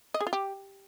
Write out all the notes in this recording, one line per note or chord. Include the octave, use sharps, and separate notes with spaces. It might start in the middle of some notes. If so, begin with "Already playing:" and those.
D#5
G#4
F4
G4